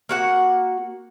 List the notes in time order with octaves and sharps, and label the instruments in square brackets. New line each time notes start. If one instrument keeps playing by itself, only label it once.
[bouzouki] A#3 F#4 F#5